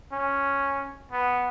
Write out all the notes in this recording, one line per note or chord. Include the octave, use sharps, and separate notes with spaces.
C#4
B3